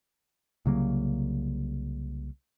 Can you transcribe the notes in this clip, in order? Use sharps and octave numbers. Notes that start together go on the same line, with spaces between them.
C2 C#3 F#3 A#3